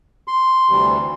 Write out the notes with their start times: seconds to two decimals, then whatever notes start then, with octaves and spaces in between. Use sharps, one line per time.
0.28 C6
0.69 D2 C3 E3 G3